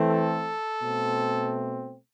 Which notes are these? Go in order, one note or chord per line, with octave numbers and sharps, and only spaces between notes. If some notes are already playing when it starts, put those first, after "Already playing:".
Already playing: E3 A3 C4
A4
B2 A3 C4